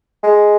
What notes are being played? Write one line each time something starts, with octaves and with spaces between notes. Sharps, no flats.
G#3